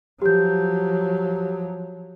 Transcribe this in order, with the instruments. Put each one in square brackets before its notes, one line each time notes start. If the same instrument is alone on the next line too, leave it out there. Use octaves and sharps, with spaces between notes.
[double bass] F3 F#3 [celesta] G4 G6